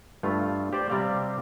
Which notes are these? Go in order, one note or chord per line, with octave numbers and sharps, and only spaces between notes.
G2 A3 F4
G4 C5 D5
C3 G3 C4 D5 F5